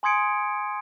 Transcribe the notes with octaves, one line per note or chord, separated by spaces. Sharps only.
G#5 C6 D#6 G#6 C#7 D7